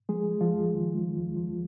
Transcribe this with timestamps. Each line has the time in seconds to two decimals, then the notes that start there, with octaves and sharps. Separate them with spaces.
0.09 F3 G#3 G#4
0.31 G#3
0.41 F3 F4
0.52 F2
0.73 D#3
0.94 G#3
1.15 D#2
1.37 F3